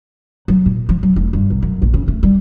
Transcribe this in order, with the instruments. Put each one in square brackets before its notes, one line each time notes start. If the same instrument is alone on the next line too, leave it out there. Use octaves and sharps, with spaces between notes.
[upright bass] F#3
A#2
F3
F#3
F1
G2
B1
F#2
A#1
C#3
A3
G3